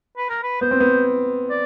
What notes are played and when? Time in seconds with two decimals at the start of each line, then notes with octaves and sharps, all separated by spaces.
0.17 B4
0.30 A#4
0.43 B4
0.61 B3 C5
0.71 C4
0.80 B3
1.50 D5